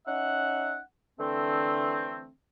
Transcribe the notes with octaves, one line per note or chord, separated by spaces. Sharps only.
C#4 D#4 E5 F#5
D3 E3 A3 C4